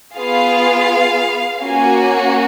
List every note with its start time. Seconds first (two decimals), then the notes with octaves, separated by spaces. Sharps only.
0.15 B3 F4 G#4 F5
1.63 A#3 C#4 F#4 G#5